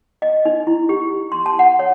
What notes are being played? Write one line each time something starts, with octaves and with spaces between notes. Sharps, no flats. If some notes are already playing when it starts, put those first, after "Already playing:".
D#5
D#4
E4
G4
C6
A5
F#5
C#5